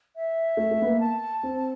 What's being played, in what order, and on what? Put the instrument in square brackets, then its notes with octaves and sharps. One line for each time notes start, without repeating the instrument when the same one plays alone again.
[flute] E5
[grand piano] A3
A3
B3
A#3
[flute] A5
[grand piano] C4